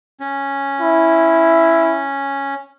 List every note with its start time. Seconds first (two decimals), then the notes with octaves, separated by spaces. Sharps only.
0.20 C#4
0.81 E4